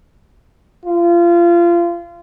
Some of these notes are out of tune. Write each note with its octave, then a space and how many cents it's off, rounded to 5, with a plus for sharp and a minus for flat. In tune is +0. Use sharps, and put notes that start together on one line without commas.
F4 -25